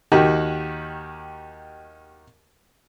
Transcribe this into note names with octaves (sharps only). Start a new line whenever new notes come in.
D#2 D#3 F#4 G4